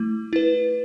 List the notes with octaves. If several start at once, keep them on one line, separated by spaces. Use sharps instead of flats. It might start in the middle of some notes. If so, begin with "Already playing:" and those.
Already playing: A3 E4
E4 B4